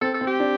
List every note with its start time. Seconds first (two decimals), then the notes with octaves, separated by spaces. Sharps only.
0.01 C4 A4
0.14 A4
0.21 C4
0.27 G4
0.40 D4